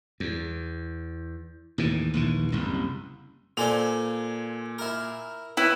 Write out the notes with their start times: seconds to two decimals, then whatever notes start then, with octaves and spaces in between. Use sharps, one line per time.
0.20 E2
1.78 D#2 A2 E3
2.14 A#1 D#2 E3
2.52 F#1 C2
3.57 A#2 A4 C5 D5 G#5 F7
4.78 E4 A#4
5.57 C#4 E4 B4 E6